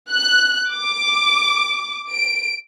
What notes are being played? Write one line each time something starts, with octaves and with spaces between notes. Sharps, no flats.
F#6
D6
D7